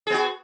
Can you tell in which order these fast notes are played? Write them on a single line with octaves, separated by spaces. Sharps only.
G#4 B3 F#4